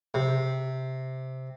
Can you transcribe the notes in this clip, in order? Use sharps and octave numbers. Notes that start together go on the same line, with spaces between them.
C3